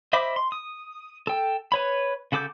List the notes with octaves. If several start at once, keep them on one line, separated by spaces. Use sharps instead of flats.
C5 D#5 E5 B5 D6
C6
D#6
A4 G5
B4 C#5 B5
C#3 F#4 A4 D6 G6